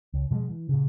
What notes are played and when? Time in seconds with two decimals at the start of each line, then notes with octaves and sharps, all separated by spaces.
0.14 C#2
0.31 B2 F3 F#3 G#3
0.50 E3
0.69 A#2 C#3